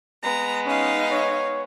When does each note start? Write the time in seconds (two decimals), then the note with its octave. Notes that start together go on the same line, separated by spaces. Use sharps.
0.23 G#3 B3 A#5
0.66 C#4 D#4 D#5 F5
1.11 C#5